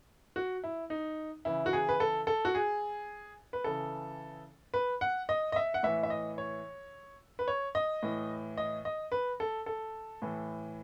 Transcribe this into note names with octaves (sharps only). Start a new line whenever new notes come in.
F#4
E4
D#4
C#3 E3 E4
F#4
G#4
B4
A4
A4
F#4
G#4
B4
C#3 E3 A4
B4
F#5
D#5
D#5
E5
F#5
A2 E3 E5
E5
D#5
C#5
B4
C#5
D#5
A2 E3
D#5
D#5
B4
A4
A4
A2 E3